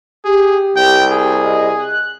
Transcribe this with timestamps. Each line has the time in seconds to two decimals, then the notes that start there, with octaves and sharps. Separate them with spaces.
0.24 G4 G#4
0.76 C2 G5
1.10 G#4
1.43 D#5
1.79 F#6